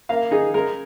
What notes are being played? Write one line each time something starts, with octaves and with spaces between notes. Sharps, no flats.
A#3 F5
D#4 G#4
G#3 A#4